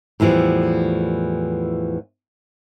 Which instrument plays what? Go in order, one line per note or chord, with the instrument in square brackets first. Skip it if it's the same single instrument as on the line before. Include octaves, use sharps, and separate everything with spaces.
[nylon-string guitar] E2 A2 E3 F3 G3